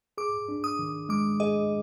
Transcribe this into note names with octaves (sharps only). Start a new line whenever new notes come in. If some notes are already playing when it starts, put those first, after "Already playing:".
G#4 D6
D4
D#6
D#3
G#3 D6
G#4 D#5